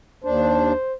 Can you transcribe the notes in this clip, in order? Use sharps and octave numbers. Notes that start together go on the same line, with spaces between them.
D#2 D4 C5